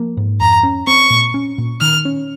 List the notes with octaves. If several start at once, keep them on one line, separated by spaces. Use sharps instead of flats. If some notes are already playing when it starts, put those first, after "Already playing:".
Already playing: F3 A#3
G#2
F2 A#5
C#4
C4 C#6
A#2
C#4
A#2
D#3 F6
C#4